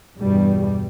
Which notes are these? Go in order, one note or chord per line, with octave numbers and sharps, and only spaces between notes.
E2 G2 B2 G3